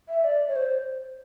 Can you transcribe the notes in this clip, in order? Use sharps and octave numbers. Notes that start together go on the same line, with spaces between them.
E5
D5
C#5
C5